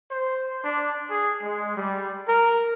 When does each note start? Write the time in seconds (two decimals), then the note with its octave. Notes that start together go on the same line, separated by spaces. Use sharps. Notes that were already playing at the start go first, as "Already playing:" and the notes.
0.11 C5
0.64 D4
1.11 G#4
1.43 G#3
1.77 G3
2.28 A#4